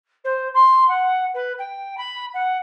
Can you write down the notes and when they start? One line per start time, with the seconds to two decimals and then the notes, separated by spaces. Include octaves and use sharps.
0.24 C5
0.54 C6
0.88 F#5
1.34 B4
1.58 G5
1.97 B5
2.33 F#5